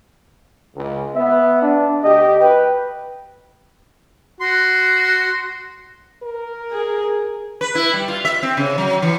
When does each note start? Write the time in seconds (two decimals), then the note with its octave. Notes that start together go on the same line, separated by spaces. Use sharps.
0.75 C#2
1.15 B3 E5
1.62 D4
2.04 D2 G4 D#5
2.41 B4 G5
4.40 F#4 C6
6.23 A#4
6.71 G#4
7.61 B4
7.75 E4
7.93 G3
8.08 F4
8.25 E5
8.43 C4
8.57 C#3
8.78 F#3
9.02 E3